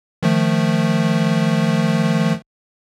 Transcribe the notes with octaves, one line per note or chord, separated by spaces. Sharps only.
D#3 F3 A3